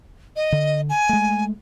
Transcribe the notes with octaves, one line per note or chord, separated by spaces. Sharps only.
D#5
D3
G#5
G#3 A3